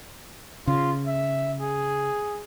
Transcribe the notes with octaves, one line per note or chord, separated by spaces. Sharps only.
C#3 F4
E5
G#4